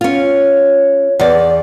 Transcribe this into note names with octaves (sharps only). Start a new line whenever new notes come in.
C#4 F4
E2 D5